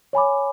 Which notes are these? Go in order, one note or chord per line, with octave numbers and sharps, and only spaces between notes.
C#5 G#5 B5 D6